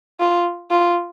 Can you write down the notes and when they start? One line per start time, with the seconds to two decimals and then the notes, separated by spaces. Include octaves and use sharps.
0.20 F4
0.70 F4